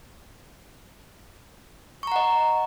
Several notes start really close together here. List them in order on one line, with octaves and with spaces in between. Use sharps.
C#6 A#5 F#5 D#5